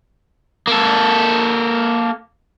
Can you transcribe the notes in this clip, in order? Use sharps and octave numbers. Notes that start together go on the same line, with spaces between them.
A#3 A4